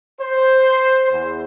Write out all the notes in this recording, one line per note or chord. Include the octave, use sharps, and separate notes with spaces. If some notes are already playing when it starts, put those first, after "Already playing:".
C5
E2